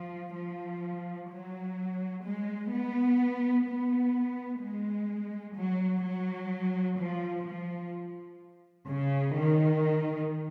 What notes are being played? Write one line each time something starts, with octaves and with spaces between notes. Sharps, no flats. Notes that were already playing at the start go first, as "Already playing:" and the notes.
Already playing: F3
F3
F#3
G#3
B3
B3
G#3
F#3
F#3
F3
F3
C#3
D#3